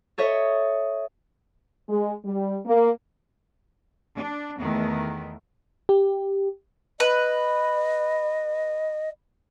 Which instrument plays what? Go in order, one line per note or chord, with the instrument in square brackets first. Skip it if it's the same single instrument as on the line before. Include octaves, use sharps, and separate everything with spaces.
[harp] A4 C#5 D#5 E5
[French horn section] G#3
G3
A#3
[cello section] D4
E2 D#3 A3 B3
[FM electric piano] G4
[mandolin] B4 [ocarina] D#5